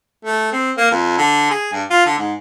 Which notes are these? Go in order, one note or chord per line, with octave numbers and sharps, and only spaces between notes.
A3
C4
A#3
F2
D3
G#4
G2
F4
D3
G#2